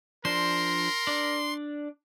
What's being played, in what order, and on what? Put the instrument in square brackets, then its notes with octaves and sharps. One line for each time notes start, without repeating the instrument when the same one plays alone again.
[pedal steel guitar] F3 D4 C5 [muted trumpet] A#4 [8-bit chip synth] C6
[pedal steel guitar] D4 D5